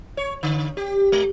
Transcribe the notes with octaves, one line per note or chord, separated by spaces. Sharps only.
C#5
D3
G4
G#3